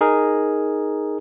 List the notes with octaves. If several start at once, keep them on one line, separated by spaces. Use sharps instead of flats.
D#4 G#4 A#4